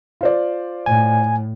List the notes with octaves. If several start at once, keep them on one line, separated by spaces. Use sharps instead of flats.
F4 C5 D5
A2 G#5